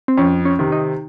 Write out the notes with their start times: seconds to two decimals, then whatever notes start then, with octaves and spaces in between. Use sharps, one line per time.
0.08 C4
0.18 F2 C#4
0.45 C#4
0.59 C3 D#3
0.72 D#4